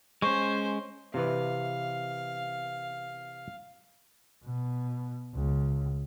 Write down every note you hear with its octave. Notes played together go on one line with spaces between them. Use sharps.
G#3 C#4 C5 C#6
C3 E3 B4 F5
B2
C#2